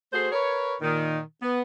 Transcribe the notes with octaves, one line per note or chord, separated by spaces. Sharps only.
A3 F#4 G#4 C5
A#4 B4 C#5
A#2 D#3
B3